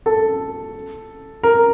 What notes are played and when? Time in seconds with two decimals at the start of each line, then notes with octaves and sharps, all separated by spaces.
0.06 A4
1.43 A#4